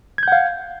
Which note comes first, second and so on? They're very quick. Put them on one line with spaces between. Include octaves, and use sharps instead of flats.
G#6 G6 F#5 F5